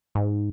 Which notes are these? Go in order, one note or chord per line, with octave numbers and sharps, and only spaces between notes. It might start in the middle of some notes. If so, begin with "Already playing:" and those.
G#2